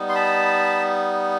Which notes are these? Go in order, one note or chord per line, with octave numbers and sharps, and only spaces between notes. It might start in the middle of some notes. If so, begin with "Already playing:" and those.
Already playing: G3 B3 D#4
C6
A5 B5